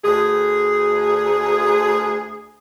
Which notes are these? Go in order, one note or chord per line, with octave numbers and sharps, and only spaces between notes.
D2 G#4